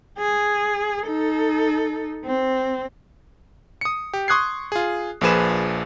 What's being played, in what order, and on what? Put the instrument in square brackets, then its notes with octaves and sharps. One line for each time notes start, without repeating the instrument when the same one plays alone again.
[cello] G#4
D#4 A4
C4
[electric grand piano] D#6 C#7
G4
C6 C#6 D#6 F#6 G#6 C7
F4 G#4
A#1 A#2 F3 G#4 B4 E7